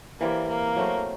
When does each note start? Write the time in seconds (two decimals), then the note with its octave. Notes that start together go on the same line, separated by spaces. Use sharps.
0.20 E3 G3 A#3 C4
0.48 A#3
0.76 F#3 A3 C4